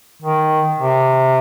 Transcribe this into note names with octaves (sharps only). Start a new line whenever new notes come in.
D#3
C3